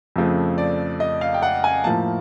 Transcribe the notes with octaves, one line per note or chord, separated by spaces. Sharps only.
F2 C#3 F3 A3
D5
D#5
F5
G5
F#5
G#5
A2 F3 A#3 A5